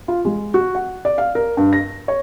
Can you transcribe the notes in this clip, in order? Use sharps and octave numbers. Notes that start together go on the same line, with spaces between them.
F4
G#3
F#4
F#5
D5
F5
A#4
G2
A#6
C#5